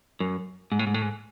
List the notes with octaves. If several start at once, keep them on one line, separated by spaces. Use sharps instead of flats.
F#2
G#2
A2
G#2
A2
G#2